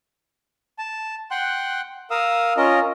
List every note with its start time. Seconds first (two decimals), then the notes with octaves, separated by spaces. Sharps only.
0.79 A5
1.31 F#5 G5 C6 F#6
2.11 A#4 F5 D#6 E6
2.57 C#4 F4 A#4 D#5